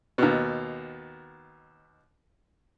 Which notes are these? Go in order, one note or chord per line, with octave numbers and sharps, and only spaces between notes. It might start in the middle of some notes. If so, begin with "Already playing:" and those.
D#2 B2